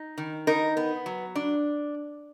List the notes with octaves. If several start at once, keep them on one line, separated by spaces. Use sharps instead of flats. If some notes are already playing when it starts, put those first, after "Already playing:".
Already playing: D#4
D#3
D#4 A#4
B3
F#3
D4